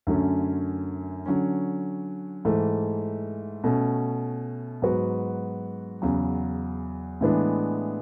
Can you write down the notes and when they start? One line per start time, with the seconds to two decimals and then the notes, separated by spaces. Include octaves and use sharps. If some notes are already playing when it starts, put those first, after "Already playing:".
0.07 F#2 D3 F#3 A3 C#4
1.26 D3 F#3 C#4
2.45 G#2 E3 A3
3.64 B2 A3 C#4
4.82 G#2 F#3 B3 F#4 B4
6.02 E2 C#3 F#3
7.21 A2 E3 G#3 B3 D4